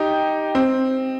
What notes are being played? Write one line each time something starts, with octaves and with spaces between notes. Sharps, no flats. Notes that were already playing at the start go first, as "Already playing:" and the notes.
Already playing: D#4 G4
C4